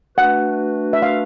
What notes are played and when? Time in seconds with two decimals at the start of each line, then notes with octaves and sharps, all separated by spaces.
0.17 A3 D4 F#4 B4 F#5
0.93 E5
1.02 F5